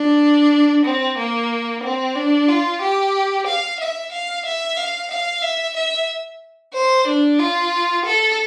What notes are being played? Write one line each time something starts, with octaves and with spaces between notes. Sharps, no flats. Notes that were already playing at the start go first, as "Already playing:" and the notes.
Already playing: D4
C4
A#3
C4
D4
F4
G4
F5
E5
F5
E5
F5
F5
E5
E5
C5
D4
F4
A4